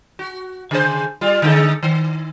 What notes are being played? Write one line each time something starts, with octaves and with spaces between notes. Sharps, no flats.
F#4
C#3 G#4 C5
G3 F4
D3 G#3 A4
D#3